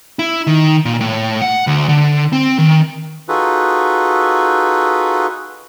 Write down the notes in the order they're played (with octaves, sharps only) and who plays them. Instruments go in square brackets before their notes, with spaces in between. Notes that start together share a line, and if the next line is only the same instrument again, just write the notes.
[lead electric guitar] E4
D#3
A#2
A2
F#5
D2
D3
C4
D#3
[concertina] D#4 F4 F#4 G#4 A4 B4